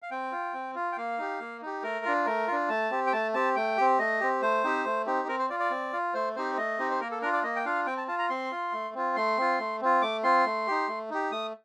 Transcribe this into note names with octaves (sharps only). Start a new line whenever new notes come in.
F5
C4 G5
F4
C4
F4
G5
A#3 F5
D#4 G4
A#3
D#4 G4
A3 A#4
D4 F4
A3 A#4
D4 F4
A3 A5
C4 G4
G5
A3 A5
C4 G4 A5
A3 G5
C4 G4
A3 D#5
C4 G4
A3 C5
C4 D#4 G4
A3
C4 D#4 G4
C4 A#4
C5
F4 D5
D5
C4
F4
A3 C5
C4 D#4 G4 C5
A3 D#5
C4 D#4 G4
C5
A#3 A#4
A4
D4 F4 A#4
D5
A#3 D#5
G5
D4 F4 F5
C4 G5
A5
F4 A5
A#5
C4 C6
F4
A3
C4 F4
A3 C6
C4 F4
A3
C4 F4
A3 D6
C4 F4 C6
A3
D#4 G4
A3
D#4 G4
A3 D#6